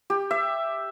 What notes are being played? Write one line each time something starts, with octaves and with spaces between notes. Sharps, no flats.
G4
E5